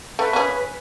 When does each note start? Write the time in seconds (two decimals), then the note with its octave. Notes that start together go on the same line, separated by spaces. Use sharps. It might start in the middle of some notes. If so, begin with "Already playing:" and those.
0.19 A3 B4
0.33 C#4 G#4